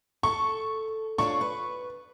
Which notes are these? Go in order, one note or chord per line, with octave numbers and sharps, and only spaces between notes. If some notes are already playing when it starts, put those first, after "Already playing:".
A4 C#6
D4 F4 C#5 C#6
B4